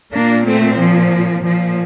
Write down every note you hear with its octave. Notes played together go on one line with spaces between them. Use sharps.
A#2 A#3 D4
A3 C4
F3
A#2 F3